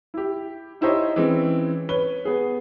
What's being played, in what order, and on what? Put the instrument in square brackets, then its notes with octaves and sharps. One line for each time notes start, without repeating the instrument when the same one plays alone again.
[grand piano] E4 G4
D#4 E4 G4 C5 C#5 D#5
E3 G#3 C4 C#4
B4 C#5 G7
B3 G#4